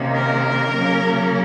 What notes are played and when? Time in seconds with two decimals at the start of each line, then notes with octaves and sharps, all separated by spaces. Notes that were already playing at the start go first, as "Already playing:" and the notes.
Already playing: C3 D#3 A#3 C#4
0.14 A#4
0.71 C#3 F#3 A#3 C#4